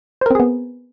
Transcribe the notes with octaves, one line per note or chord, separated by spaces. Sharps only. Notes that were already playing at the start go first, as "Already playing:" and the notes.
B3 C4 G#4 A#4 C5